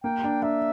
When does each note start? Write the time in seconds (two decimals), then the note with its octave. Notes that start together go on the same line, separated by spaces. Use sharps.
0.04 A#3 G5
0.24 D4
0.42 D4 E5